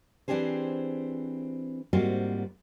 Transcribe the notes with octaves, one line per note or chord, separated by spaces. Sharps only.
E3 C4 D4 G4 G#4 C5
G#2 G3 A#3 C4 F4 F#4